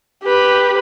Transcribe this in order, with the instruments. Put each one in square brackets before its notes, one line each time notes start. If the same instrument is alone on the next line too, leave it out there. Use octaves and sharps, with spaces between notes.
[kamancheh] G4 B4